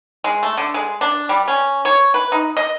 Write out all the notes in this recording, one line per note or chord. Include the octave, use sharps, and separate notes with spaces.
G#3
A3
D3
G#3
D4
G3
C#4
C#5
B4
D#4
D#5